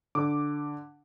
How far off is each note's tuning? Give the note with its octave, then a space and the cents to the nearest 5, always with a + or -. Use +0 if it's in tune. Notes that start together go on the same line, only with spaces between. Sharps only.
D3 +0 D6 +0